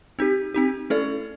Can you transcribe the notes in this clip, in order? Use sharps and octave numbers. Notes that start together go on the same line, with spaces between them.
C4 D#4 G4
C4 D#4 G4
A3 C#4 E4 A4 D5